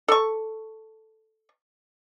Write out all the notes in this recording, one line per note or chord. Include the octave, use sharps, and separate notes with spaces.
A4 C#6